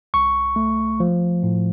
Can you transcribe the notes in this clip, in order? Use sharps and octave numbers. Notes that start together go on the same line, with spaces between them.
C2 C#6
A3
F3
A2